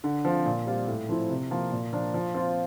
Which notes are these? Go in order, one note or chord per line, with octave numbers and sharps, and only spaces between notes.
D3
F3 C4 F4
A#2
G3 C4 F4
A2
F3 C4 E4
C3
F3 A#3
A#2
F3 A#3 D4
F3
C4 F4